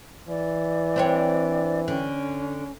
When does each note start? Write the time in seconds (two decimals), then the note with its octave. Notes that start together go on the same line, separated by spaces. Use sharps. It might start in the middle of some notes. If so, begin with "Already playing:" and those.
0.28 E3 D5
0.96 C4 D4 C#5
1.88 D3 C#4